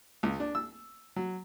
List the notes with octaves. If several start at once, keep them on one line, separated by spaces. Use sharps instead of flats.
C#2
D4
E6
F#3